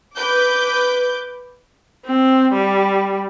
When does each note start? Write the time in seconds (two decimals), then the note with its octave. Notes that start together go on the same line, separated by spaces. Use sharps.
0.17 B4 D6 G6
2.05 C4
2.53 G3